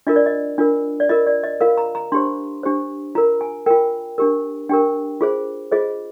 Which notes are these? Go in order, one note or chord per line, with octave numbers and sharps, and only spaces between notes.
D4 F4 A#4 D#5
D5
D#5
D4 F4 A#4
D5
F4 A#4 D#5
D5
D#5
F4 A#4 F5
A#5
A#5
D4 G4 C5 C6
D4 G4 C5
F4 A#4 A#5
G#5
F4 A#4 G5
D4 G4 A#4
D4 G4 A#4 G5
F4 G#4 C5
F4 G#4 C5 D#5